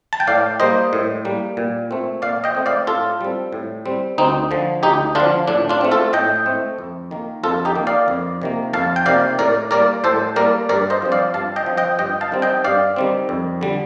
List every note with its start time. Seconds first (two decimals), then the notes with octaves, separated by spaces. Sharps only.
0.13 A5
0.20 G5
0.27 A2 D5 F5
0.60 G3 A#3 C5 D#5
0.93 A2
1.25 G3 A#3
1.57 A#2
1.91 A3 C4
2.22 A#2 D5 F5
2.44 D#5 G5
2.55 A3 C4
2.66 D5 F5
2.87 A2 F4 A4
3.21 G3 C4
3.52 A2
3.86 G3 C4
4.18 D2 C4 D#4
4.51 D3 F3
4.83 D2 D#4 G4
5.15 D3 F3 D4 F4
5.48 A2 D4
5.69 D4 F4
5.81 A3 C4
5.91 F4 A4
6.13 A2 D#5 G5
6.46 A3 C4
6.79 F2
7.11 D#3 A#3
7.43 F2 F4 A4
7.65 D#4 G4
7.75 D#3 A#3
7.87 D5 F5
8.08 F2
8.42 C3 D#3 A#3
8.73 F2 F5 A5
8.96 G5
9.06 C3 D#3 A#3 D5 F5
9.39 A2 A#4 D5
9.71 G3 A#3 A#4 D5
10.04 A2 A4 C5
10.36 G3 A#3 A#4 D5
10.69 G2 A#4 D5
10.90 C5 D#5
11.02 F3 C4
11.12 D5 F5
11.34 G2 F5 A5
11.56 D#5 G5
11.66 F3 C4
11.77 D#5 G5
11.99 G2 D#5 G5
12.21 F5 A5
12.32 D#3 G3 C4
12.42 D#5 G5
12.64 G2 D5 F5
12.96 D#3 G3 C4
13.29 F2
13.61 D3 G3